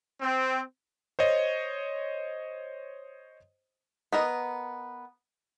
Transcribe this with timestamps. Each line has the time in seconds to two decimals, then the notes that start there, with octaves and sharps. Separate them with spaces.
0.21 C4
1.19 C5 C#5 D#5
4.12 B3 A#4 D#5